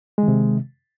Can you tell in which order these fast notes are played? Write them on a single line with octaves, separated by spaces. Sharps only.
G#3 D#3 C3